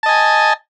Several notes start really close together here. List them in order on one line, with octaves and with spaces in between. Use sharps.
A5 D#5 G#5